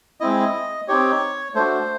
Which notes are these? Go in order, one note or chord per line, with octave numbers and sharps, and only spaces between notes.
G#3 C4 E4 D#5
C4 D#4 G4 C#5
A3 D4 F#4 C5